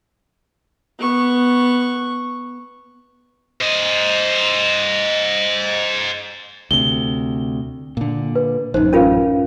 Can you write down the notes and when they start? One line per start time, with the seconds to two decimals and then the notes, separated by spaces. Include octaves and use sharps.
0.99 B3 C#6
3.61 C5 D#5
6.71 D2 C3 G7
7.97 A#2 D3
8.36 B4
8.74 A1 F#2 D#4 C5
8.93 C#4 F4 A#4 B4 F5